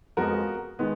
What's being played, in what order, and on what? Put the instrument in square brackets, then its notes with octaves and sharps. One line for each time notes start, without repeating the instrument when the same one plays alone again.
[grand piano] F2 F3 G#3 B3 F#4 A#4
D#3 G#3 B3